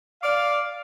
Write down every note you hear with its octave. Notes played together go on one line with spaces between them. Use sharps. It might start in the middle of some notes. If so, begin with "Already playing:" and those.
D5 F5